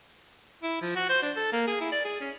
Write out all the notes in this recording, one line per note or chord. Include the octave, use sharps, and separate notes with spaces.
E4
F3
F#4
C5
D4
A4
A#3
G#4
E4
D5
G#4
C#4